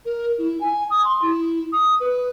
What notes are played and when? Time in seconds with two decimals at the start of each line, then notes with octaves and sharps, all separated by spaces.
0.05 A#4
0.38 E4
0.61 G#5
0.90 D#6
1.04 C6
1.22 E4
1.72 D#6
2.00 B4